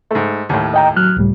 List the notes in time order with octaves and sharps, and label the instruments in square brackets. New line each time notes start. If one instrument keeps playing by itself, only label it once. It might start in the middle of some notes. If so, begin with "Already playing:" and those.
[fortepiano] G#2 A3
D#2 A2
[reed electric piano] D#5 G5 A#5
F#3 F6 F#6
C#2 A2 G3